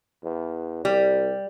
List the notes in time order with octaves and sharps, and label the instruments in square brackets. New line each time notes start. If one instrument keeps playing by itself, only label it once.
[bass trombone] E2
[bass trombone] C2 [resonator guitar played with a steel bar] G3